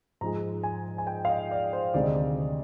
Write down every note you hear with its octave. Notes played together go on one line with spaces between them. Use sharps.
G#2 F3 G#3 A#5
G#5
G#5
G5
F5
D#5
D5
C5
D2 C3 D#3 G#3 D5
D#5
D5